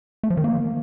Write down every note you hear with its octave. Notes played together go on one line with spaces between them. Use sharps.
A3
F3
D#3
A#3